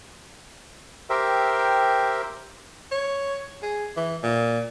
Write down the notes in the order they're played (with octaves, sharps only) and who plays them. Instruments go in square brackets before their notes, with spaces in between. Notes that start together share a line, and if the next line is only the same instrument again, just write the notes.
[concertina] G4 A#4 C5 E5 G5
[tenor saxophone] C#5
G#4
E3
A#2